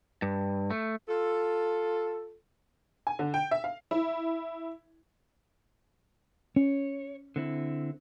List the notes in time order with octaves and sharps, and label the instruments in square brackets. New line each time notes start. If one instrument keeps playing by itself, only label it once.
[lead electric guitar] G2
A3
[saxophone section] F4 A4
[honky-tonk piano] G#5
D3
G5
E5
F5
E4
[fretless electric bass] C#4 [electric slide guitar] C#5
[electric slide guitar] D3 C4 E4